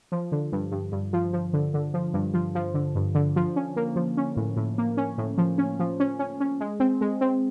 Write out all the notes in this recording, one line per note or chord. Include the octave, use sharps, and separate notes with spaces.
F3
D3
G2
G2
G2
F3
F3
D3
D3
F3
G2
F3
F3
D3
G2
D3
F3
C#4
A#3
F3
C#4
A2
A2
A#3
C#4
A2
F3
C#4
F3
C#4
C#4
C#4
G#3
C4
G#3
C4